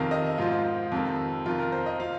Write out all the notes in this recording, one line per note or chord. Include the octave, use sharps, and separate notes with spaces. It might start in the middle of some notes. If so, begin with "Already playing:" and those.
Already playing: F2 C3 D#3 F5
D#5
G#2 F3 F4
F2 C3 D#3
F2 D#3 F4
A#4
C5
D#5
F3 F5